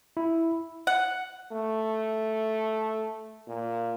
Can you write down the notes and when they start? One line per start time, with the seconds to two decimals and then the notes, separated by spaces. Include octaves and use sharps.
0.17 E4
0.87 F#5
1.52 A3
3.47 A#2